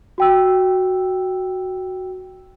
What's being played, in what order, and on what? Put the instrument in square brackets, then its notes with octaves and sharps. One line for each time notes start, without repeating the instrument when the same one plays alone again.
[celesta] F#4 G5 E6